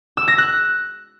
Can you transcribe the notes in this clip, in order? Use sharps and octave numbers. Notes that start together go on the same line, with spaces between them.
E6
A#6
F#6